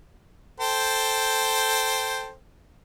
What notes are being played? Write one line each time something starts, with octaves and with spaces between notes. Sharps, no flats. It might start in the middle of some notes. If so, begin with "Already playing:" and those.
A4 C5 G5